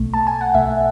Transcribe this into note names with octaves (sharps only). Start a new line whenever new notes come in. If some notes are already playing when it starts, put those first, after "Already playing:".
Already playing: B1 B2 A3
A5
G#5
F#5
B1 B2 A3 E5